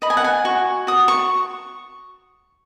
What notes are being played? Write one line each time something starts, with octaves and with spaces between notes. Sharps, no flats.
D#5 B5
G#5
F#5
G#5
F#4 C#6
F#4 D#6
C#6